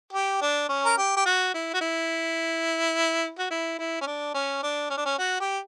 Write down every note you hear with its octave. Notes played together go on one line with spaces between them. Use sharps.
G4
D4
C#4
A#4
G4
G4
F#4
E4
F#4
E4
F#4
E4
E4
C#4
D4
C#4
D4
C#4
D4
C#4
F#4
G4